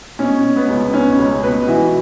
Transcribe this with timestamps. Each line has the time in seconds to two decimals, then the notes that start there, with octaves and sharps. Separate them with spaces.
0.19 B2 C#4
0.44 B2
0.56 B3
0.69 C#2
0.94 B2 C#4
1.19 C#2
1.43 B2 B4
1.68 E3 F#4